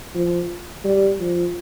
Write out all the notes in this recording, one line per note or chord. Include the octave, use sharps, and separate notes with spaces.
F3
G3
F3